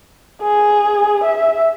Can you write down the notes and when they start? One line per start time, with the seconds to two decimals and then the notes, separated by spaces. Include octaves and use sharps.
0.42 G#4
1.24 E5